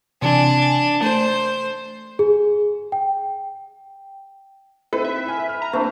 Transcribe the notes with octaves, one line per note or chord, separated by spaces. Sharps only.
C3 E3 D4 G#5
A3 C5
G#4
G5
C4 D#4 E4 A4 B4
E5
G#5 F6
F6
A#5
A3 A#3 C4 D4 E4